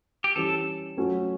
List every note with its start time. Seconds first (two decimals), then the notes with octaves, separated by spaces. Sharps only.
0.24 G4
0.36 E3 G3 C#4 G4 A4
0.97 F#3 A3 C#4 F#4 A4